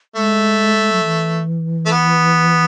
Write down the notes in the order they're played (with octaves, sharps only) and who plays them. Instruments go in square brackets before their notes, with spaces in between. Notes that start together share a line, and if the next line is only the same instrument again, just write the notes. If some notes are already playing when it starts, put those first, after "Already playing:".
[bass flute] G#3 [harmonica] A3
[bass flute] F#3
E3
[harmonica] A3
B3